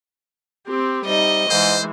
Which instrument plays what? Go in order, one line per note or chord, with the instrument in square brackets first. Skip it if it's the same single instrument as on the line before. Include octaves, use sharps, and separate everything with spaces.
[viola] C4 G4
[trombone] C3 [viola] G3 D#4 [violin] D#5
[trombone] G#2 [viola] E3 G#3 [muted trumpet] C5